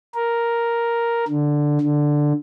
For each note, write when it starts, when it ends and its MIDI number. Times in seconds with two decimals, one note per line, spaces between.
0.15 1.25 70
1.28 1.78 50
1.81 2.33 50